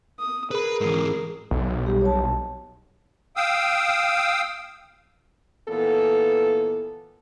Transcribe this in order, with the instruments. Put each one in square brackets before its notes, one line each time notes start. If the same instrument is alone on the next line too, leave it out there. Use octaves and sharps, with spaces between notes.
[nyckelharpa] D#6
[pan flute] G#4 [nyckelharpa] A#4 [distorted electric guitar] B4 B5
[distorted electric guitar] G#2 E3
[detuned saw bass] B1
[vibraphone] G3 G4
C#5 A5
[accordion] F5 G5 D#6 E6
[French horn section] A#2 E3 B3 A4